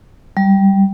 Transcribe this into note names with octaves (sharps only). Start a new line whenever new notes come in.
G3